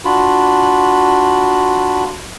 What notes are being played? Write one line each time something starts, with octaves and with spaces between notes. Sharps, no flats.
D4 F4 F#4 B5